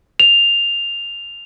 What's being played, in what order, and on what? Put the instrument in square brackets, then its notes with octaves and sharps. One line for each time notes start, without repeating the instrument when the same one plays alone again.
[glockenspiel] F7